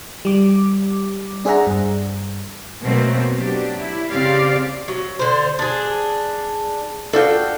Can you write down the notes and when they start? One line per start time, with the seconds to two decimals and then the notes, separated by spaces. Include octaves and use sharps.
0.25 G3 D6
1.45 D4 G#4 C5 E5 F#5 A#5
1.67 G2
2.83 B2 F#3 A3 A#3 C4
3.36 F#3 D4 G4
3.80 E4
4.10 C#3 C4 G4 D5 F5
4.88 F#3
5.19 D3 C5
5.59 D4 G#4
7.13 D4 F4 F#4 A4 G5